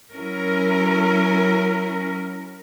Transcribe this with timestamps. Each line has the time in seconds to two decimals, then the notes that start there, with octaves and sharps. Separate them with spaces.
0.14 F#3 C#4 E4 A#4